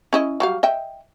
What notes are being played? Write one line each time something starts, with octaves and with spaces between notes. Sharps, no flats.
C#4 E4 D#5
F#3 G3 F5
D#5 E5 G5